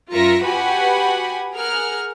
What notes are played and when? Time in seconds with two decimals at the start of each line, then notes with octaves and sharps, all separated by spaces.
0.13 F#2 F4 A#4 E5 A#6 C#7
0.45 F#4 G4 B4 F#5 G#5 B5
1.54 G#4 A#4 F#5 F6